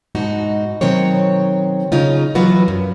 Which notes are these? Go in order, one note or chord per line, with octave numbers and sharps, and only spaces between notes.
G#2 B2 D#4 F#4
B2 D#3 F#3 C4 C#5
C#3 C#4 D#4 F4
E3 F#3 B3 F4 F#4 B4
F#2